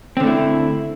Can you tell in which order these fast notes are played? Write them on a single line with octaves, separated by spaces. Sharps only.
C4 D3 A3 E4